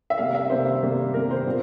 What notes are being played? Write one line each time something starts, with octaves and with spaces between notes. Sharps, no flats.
E5
C3 G3 A#3 F5
E5
C3 G3 A#3 C5
C3 G3 A#3
C3 G3 A#3 A#4
C5
A#2 G3 C4